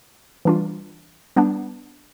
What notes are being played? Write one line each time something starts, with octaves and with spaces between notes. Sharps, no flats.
E3 G3 D4 F4
G3 B3 D4